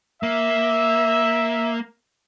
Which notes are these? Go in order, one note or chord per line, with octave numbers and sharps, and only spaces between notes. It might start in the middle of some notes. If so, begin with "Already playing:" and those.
A#3 E5